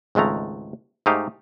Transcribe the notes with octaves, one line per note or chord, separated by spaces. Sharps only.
G#1 C#2 G#3 A3 A#5
G#2 A3 D#4 G4 F5